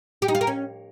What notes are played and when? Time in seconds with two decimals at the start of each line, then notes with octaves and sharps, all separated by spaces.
0.22 G4
0.28 D#4
0.35 F4
0.41 A#4
0.47 C#4